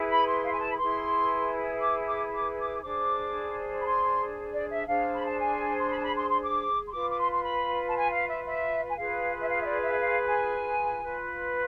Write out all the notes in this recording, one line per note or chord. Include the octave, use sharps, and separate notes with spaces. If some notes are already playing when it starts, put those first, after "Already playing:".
Already playing: E4 G#4 B4
B5
C6
F5
G#5
A5
B5
E4 G#4 B4 C6
D6
D6
D6
D6
D4 G#4 C5 D6
B5
C6
D5
E5
D4 G#4 C5 F5
B5
A5
G#5
C6
B5
A5
B5
C6
C6
D6
C6
F4 B4 D6
D6
C6
C6
B5
A5
G#5
F5
E5
E5
G#5
F4 G#4 B4 F5
E5
F5
E5
D5
E5
F5
G#5
F4 B4